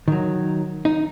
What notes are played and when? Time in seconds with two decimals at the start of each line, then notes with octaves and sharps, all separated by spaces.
0.08 D#3 F#3
0.85 D#4